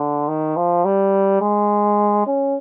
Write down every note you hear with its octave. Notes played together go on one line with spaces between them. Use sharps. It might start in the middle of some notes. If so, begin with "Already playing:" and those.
Already playing: D3
D#3
F3
G3
G#3
C#4